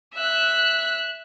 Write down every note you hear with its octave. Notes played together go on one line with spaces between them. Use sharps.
E5 F#6